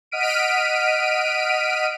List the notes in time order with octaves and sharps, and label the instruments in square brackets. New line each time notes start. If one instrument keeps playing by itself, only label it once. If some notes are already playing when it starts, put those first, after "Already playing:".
[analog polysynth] D#5 F#5 F6 B6 D7 D#7